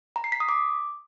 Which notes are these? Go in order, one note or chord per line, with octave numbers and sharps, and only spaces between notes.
A#5
C7
B6
D#6
D6